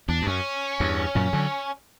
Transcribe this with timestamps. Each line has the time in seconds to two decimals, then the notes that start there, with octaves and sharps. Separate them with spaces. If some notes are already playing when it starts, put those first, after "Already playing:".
0.08 E2 D4
0.22 G2
0.27 F#2 C#4
0.80 E2 G2
1.15 F#2 A#2
1.33 D3 F#3